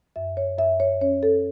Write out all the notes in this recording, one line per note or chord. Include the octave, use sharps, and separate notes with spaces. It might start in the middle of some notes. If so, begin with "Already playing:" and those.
F#2 E5
C#5
F#2 E5
C#5
C#4 C#5
A4